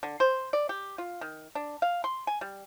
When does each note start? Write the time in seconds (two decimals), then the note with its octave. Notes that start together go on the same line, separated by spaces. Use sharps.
0.03 D3
0.20 C5
0.53 D5
0.69 G4
0.98 F4
1.21 D#3
1.55 D4
1.82 F5
2.04 C6
2.27 G#5
2.41 G3